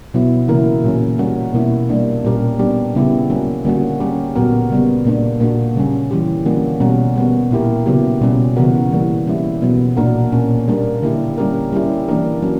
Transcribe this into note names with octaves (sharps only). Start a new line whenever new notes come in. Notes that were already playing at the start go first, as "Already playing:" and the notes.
B2 F#3 B3 E4
C#3 E3 A#3 E4 A#4
A#2 F#3 C#4
G3 C#4 F#4 A#4
B2 A#3 E4
G3 A#3 D4
A#2 G3 C#4 G4 A#4
G3 B3 D4 G4
C#3 G3 B3 E4 G4
F#3 A#3 C#4
D3 G3 A#3 C#4 F#4
G3 C#4 G4 A#4
A#2 F#3 B3 F#4 A#4
C#3 G3 B3
A#2 A#3 D4
A#2 A#3 D4 F#4
C#3 G3 C#4
E3 G3 C#4 G4
D3 G3 A#3 C#4 F#4
B2 G3 C#4 F#4 A#4
G3 B3 F#4
A#2 A#3 E4 G4 A#4
C#3 F#3 B3 E4 G4
B2 G3 C#4
C#3 E3 B3 F#4 A#4
E3 G3 A#3
G3 C#4 E4
B2 F#3 B3
A#2 A#3 D4 F#4 A#4
A#2 A#3 C#4
G3 A#3 D4 A#4
D3 A#3 E4 G4
G3 C#4 G4 A#4
G3 C#4 E4 G4
E3 A#3 D4 A#4
F#3 C#4